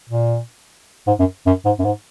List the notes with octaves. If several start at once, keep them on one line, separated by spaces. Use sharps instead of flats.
A#2
G#2
F#2
F#2
G#2
F#2
G#2